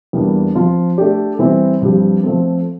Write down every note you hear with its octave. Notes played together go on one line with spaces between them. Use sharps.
E2 E3 G3 A#3 D4
F3 C4 F4
A3 D4 G4 D5
E3 G3 C4 E4
G2 F3 C4 G4
F3 A3 C4